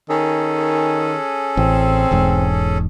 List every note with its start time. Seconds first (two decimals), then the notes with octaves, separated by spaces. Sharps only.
0.09 D#3 C#4 G#4 A4
1.57 A1 C4
2.11 E1 E2 G#2